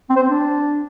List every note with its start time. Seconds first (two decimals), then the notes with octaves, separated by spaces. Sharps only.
0.10 C4
0.16 C5
0.23 C4
0.29 D4